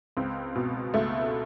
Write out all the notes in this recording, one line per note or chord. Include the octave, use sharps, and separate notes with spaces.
C#2 C4
B2
C#2 A3